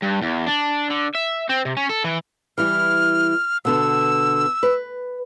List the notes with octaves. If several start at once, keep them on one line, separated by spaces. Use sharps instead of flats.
G2
E2
D4
D3
E5
C4
C3
C#4
A4
E3
E3 G3 E4 F6
B2 D3 B3 E6
B4